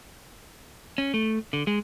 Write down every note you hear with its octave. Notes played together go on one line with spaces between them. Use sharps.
C#4
A3
D3
G#3